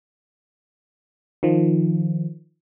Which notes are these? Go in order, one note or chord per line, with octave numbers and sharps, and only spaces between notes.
D#3 F3